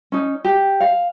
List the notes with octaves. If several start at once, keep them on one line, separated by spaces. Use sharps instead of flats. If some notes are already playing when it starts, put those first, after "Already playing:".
C#4 D#4
G4
F5